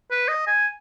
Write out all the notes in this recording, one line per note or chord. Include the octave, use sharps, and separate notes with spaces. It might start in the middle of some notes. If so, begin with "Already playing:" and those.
B4
D#5
G#5